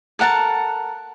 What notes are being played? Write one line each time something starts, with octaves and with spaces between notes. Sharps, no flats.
A4 A#4 F#5 A5